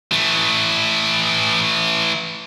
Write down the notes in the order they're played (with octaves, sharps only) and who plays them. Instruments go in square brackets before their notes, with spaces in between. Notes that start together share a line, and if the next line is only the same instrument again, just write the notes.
[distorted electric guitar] E3 A3